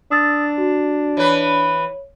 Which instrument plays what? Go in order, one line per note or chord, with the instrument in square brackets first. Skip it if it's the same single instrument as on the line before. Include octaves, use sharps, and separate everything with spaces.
[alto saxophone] D4 [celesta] D#6 E6 A6
[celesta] F#4
[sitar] E3 B4 [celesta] C#5